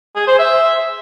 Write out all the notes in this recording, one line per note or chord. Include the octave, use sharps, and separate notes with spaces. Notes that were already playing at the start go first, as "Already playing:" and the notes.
G#4
C5
E5